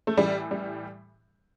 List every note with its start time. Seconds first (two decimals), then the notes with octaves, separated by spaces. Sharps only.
0.07 A3
0.17 A2 E3 G3
0.51 G3